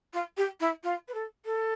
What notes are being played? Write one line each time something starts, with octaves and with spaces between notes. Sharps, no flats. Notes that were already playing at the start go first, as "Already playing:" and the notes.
F4
G4
E4
F4
B4
A4
A4